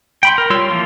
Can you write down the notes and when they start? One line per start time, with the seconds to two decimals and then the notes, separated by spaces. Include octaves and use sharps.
0.23 G5 B5 C6
0.38 A#4
0.50 G3 F4 C#5 C6 E6
0.71 E3 F3 A#3 F4